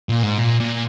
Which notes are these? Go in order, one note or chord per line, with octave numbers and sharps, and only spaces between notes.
A#2
G#2
A#2
A#2